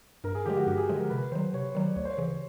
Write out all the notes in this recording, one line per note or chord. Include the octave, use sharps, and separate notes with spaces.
G2 A#4
G#4
D3 F3 G#3 G4
F#4
G2 G4
G#4
D3 F3 G#3
A#4
C3 B4
D#3 F#3 C5
C3 C#5
D#3 F#3 D5
D2 C#5
C5
C#5
C#3 E3
C#5